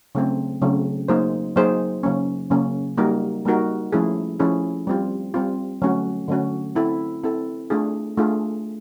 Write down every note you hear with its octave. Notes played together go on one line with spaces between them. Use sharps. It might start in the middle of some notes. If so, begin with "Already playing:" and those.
C#3 F#3 A3 C4
C#3 F#3 A3 C4
F#3 A#3 D#4 G#4 C5
F#3 A#3 D#4 G#4 C5
C#3 F#3 A#3 C#4
C#3 F#3 A#3 C#4
G3 A#3 D#4 F#4 A#4
G3 A#3 D#4 F#4 A#4
F3 A3 C#4 E4 G#4
F3 A3 C#4 E4 G#4
G3 C4 F4
G3 C4 F4
D3 F#3 A3 C#4 F#4
D3 F#3 A3 C#4 F#4
C4 E4 A4
C4 E4 A4
A3 D4 F4 G#4
A3 D4 F4 G#4